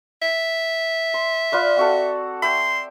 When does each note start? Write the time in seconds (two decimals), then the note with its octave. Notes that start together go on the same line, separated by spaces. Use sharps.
0.22 E5
1.14 C6
1.52 F4 B4 D5
1.77 C4 F#4 A4
2.42 E5 G5 C6